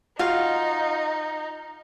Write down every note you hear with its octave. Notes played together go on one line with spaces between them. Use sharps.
D#4 F4 F#4 F5